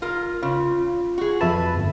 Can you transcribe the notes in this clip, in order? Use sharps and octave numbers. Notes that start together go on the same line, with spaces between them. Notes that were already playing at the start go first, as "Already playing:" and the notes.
F4 A#4
C#3 F4
F#4 G#4
F2 B4 E5 A5
G1